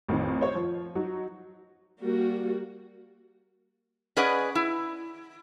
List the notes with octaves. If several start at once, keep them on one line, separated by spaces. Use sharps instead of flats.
A1 F2 D#3
C5 C#5
F3
F#3 D#4 F#4
G3 A#3 F#4
C#4 G#4 B4 D5 D#5 F#5
E4